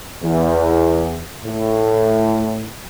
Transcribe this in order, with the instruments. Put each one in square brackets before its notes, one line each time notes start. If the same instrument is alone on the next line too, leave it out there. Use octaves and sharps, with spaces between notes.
[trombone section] E2
A2